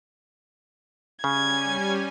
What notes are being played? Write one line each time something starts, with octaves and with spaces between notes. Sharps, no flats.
C#3 G3 C#4 G#5 G#6